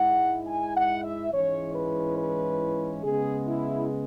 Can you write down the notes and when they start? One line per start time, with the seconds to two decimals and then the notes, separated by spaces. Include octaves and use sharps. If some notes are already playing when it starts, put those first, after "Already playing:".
Already playing: G#2 G#3 E4 F#5
0.47 G#5
0.76 F#5
1.04 E5
1.33 G#2 E3 G#3 C#4 E4 C#5
1.75 B4
2.18 B4
3.03 C#3 G#3 B3 G#4
3.47 E4